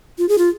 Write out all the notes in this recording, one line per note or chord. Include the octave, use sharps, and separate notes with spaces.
F4
G#4
F4